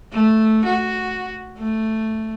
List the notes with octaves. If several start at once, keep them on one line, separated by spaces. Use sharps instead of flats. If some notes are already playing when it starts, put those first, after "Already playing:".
A3
F#4
A3